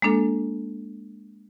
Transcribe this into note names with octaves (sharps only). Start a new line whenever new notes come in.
G#3 A#3 D4 A4